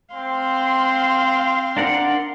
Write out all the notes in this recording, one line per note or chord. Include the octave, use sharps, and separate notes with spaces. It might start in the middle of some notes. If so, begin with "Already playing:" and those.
C4 F5 C6
D4 A#4 F#5